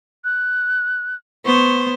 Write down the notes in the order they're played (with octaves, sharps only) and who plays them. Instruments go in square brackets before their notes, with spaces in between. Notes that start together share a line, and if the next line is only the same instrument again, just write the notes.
[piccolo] F#6
[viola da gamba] B3 C5 [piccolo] C#6